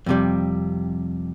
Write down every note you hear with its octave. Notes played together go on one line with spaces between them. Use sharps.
F2 C3 G3